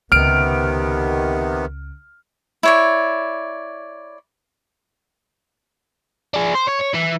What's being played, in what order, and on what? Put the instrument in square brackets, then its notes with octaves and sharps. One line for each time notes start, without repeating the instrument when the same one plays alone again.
[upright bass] C#2 [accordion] C3 D#3 B3 [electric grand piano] F6 D7
[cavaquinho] E4 C#5 D5
[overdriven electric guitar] D4 G#4
C5
C#5
C#5
E3